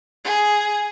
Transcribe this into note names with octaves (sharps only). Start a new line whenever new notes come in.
G#4